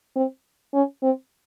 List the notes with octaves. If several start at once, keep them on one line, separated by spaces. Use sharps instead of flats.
C4
C#4
C4